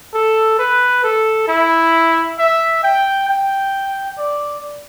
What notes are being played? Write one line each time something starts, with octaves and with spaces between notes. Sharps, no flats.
A4
B4
A4
E4
E5
G5
G5
D5